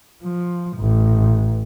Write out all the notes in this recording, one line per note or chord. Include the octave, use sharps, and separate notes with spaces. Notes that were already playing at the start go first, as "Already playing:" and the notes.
F3
A1